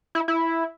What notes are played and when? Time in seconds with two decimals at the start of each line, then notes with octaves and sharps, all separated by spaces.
0.15 E4
0.28 E4